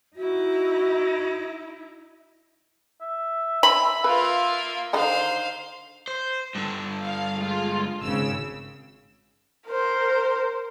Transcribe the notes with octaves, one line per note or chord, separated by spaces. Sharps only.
D#4 E4 F#4
E5
B5
A#3 F4 B4
D3 D#3 D#4 C5 F5
C5
G2 D3
F5
G#3 F4
G#1 C#3 E6
A#4 C5